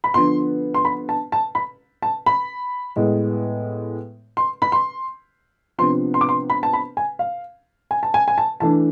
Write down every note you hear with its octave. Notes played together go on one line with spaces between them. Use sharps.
B5
D3 F3 B3 D4 C6
C6
B5
A5
A5
B5
A5
B5
A2 G#3 B3
C6
B5
C6
C3 F3 B3 D4 C6
C6
D6
C6
B5
A5
B5
G#5
F5
G#5
A5
G#5
G#5
A5
E3 A3 D4 A5